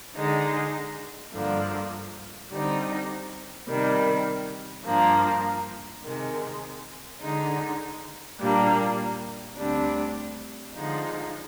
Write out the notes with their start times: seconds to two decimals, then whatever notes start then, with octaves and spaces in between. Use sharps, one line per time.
0.14 D3 G#3 D#4
1.32 G2 D3 F3 A#3
2.50 D3 G3 C4 D#4
3.68 C3 D#3 G3
4.85 G2 F3 A#3 D4
6.03 C3 D#3 G#3
7.21 D3 G#3 D#4
8.39 A#2 G3 A#3 D4
9.56 D2 C3 G3 D4
10.74 D3 F3 G#3 D#4